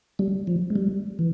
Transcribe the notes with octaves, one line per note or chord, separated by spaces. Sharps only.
G3
F3
G#3
G3
E3